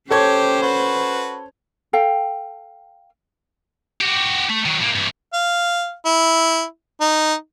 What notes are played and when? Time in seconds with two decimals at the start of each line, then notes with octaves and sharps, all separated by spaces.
0.10 C#4 G4 A4 C5 C#5 G#6
0.62 F#4 B4
1.93 A4 F5 G5
4.01 F#4 G4
4.49 A3
4.66 D#3 F#3
4.81 A2 A#3
4.96 G2 E3
5.33 F5
6.05 E4
7.01 D#4